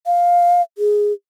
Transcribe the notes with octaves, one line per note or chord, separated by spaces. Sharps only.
F5
G#4